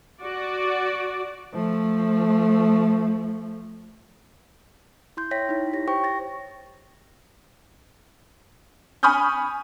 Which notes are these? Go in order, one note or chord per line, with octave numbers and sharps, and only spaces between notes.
F#4 D5
F3 A3
E4 C6 G6
C#5 E5 G5 A#6 B6
D#4 E4
G4 C#5 A#6
G4 C5 G5 C#6
A6 A#6
G#5 B5 C#6 D#6 F6 G6